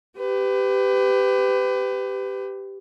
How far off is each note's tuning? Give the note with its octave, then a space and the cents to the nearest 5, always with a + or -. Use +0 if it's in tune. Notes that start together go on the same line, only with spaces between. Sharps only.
G4 +0 B4 +30